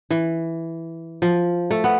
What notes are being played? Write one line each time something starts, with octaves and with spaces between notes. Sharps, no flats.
E3
F3
A3
B3